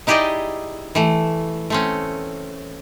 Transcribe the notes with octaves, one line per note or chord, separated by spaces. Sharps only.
D#4 E4 G4 G#4 D5 D#5
E3 A3
A3 C4 C#4